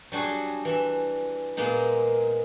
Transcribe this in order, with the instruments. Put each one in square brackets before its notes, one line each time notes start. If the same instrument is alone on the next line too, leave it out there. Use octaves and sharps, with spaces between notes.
[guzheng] F#3 G3 D4 F#4 G#4
E3 E5
A#2 G#3 A#3 B3 D#4